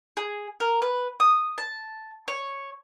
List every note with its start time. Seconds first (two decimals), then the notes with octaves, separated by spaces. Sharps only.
0.17 G#4
0.60 A#4
0.82 B4
1.20 D#6
1.58 A5
2.28 C#5